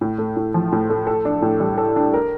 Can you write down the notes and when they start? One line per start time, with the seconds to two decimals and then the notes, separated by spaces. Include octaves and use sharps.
0.01 A2
0.18 A3
0.36 A2
0.54 F3
0.72 A2
0.90 A3
1.07 A4
1.25 D4
1.42 A2
1.60 G3
1.78 A4
1.96 D4
2.14 A#4